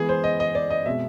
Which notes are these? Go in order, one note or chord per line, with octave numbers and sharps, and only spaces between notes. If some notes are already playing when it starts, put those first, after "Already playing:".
Already playing: E3 G#3 B3 G#4
C5
D#5
D#5
D5
D#5
B2 G#3 C4 E5